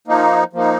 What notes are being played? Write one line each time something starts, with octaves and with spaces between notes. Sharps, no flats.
F3 A#3 D#4
F3 A#3 D#4